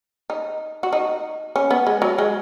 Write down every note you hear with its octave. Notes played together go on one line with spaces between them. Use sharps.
D#4
F#4
D#4
C#4
B3
G#3
F#3
G#3